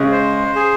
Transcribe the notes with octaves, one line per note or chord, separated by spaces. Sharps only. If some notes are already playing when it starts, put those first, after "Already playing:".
Already playing: C#3 G#3
C5
G#4